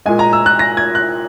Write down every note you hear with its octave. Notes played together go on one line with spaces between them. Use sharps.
A#2 G#3 G#5
A#5
E6
F#6
A#6
G#6
F#6